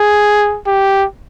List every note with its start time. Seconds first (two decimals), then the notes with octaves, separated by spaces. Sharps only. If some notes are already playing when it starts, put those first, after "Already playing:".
Already playing: G#4
0.67 G4